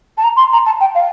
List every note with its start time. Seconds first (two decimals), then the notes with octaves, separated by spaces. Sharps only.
0.17 A5
0.23 A#5
0.37 C6
0.52 A#5
0.66 A5
0.80 G5
0.95 F5